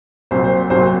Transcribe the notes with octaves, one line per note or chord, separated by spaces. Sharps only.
C2 A#2 F#3 C5
C5
C2 A#2 F#3 C5